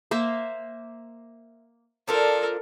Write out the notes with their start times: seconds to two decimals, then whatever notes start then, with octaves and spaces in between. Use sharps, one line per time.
0.11 A#3 C5 E5
2.08 F3 D4 F4 A4 A#4